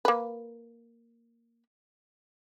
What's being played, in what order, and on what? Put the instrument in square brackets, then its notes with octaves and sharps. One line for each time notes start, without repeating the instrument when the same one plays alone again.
[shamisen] A#3 B4